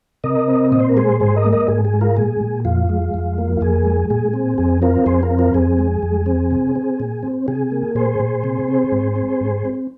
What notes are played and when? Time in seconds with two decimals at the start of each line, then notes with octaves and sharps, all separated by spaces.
0.24 C3 A#4 D#5
0.48 C4
0.72 A#2 D#5
0.80 C5
0.89 A#4
0.97 G#3 G#4 C5
1.20 G#2 G#4 C5
1.36 A#4 D#5
1.44 A#3
1.52 A#4 D#5
1.68 G#2 G#4
1.85 G#4
1.93 G#3
2.01 F4 A#4
2.17 A#2 G#4
2.41 A#2
2.65 F2 F4
2.89 G#3
3.14 F2
3.38 A#3
3.57 F4
3.61 F2 G#4
3.85 G#3
4.10 A#2 G#4
4.33 C4
4.58 F2 G#4
4.82 C4 F4 A#4
5.06 F2 G#4 C5
5.23 F4 A#4
5.30 C4
5.39 F4 A#4
5.54 F2 G#4
5.78 G#3
6.03 F2
6.26 C4
6.51 C3
6.76 C4
7.00 A#2
7.23 C4
7.48 C3 G#4
7.72 A#3
7.95 A#2 G#4 C5
8.19 A#2
8.44 C3
8.68 C4
8.92 G#2
9.16 C4
9.41 G#2
9.65 C4